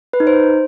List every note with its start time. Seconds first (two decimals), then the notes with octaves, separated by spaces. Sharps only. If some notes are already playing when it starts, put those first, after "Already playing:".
0.13 B4
0.20 D#4
0.27 C5